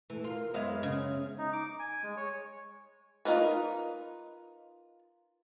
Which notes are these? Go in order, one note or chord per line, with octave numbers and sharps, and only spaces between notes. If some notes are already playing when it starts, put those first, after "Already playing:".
E3 A3
F4 A#4
F#2 G#3 B3 C5 E5 F5 G#6
C#3
D#4
D6
G#5
G#3
C#5
D#4 F4 A#4 B4